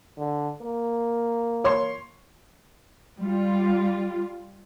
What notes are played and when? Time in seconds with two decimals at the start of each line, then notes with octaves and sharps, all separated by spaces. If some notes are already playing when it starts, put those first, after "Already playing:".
0.18 D3
0.62 A#3
1.64 C#5 C6 C#6
3.19 G3 F4